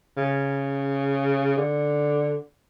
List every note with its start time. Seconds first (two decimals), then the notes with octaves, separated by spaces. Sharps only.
0.17 C#3
1.58 D3